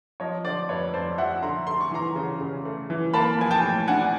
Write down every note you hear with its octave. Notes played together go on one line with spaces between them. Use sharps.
F3 C#5 D#5
D3 C5 D5
F2 B4 C#5
F2 C5 D5
F3 E5 F#5
D3 A#5 C6
A3 C6
C#6
E3 A#5 C6
C#3
C#3
A3
E3
A#3 A5 B5
F3 G#5
G5 A5
A2
D4 F#5 G#5